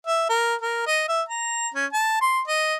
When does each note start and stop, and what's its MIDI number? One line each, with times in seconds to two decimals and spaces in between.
0.07 0.26 76
0.29 0.55 70
0.62 0.84 70
0.87 1.04 75
1.09 1.22 76
1.29 1.69 82
1.75 1.86 61
1.93 2.17 81
2.21 2.40 84
2.48 2.76 75